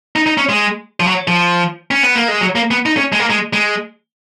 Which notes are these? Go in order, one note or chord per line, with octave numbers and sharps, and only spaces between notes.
D#4
D#4
C#4
G#3
F3
F#3
F3
C#4
B3
A#3
G#3
F#3
A#3
B3
D#4
C#4
G#3
A#3
G#3
G#3